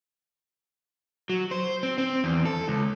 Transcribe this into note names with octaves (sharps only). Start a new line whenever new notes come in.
F#3
C5
C4
C4
E2
A4
C#2